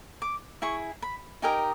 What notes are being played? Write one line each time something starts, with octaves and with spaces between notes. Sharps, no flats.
D6
E4 G#4 C#6
B5
D#4 G4 A#4 D#5 G#5